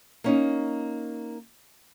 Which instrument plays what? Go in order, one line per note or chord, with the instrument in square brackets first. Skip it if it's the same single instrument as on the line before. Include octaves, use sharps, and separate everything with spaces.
[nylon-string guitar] A#3 C#4 D#4